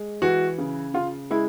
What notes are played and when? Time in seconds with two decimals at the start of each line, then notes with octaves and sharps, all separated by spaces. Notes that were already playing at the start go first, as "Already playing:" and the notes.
Already playing: G#3
0.22 E3 F#4
0.58 C#3
0.94 C#3 F4
1.30 G#3 E4